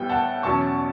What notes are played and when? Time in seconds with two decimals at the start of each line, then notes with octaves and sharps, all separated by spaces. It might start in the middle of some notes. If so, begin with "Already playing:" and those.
Already playing: A2 G3 B3 G5
0.09 F#5 A5
0.43 E2 B2 F#3 C#4 A5 C#6